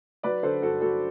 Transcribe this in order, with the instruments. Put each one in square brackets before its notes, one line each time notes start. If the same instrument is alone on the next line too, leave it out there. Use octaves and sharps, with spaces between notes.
[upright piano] F#3 B4 D5
D3 A4 C5
G2 F#4 A4
F#3 F#4 A4